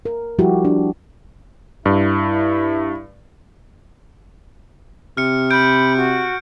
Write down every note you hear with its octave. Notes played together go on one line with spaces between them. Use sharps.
A#4
F3 G3 E4 F#4 G4
D4
G2 E4
C3 F6 C#7
B5 G6 D7
F#4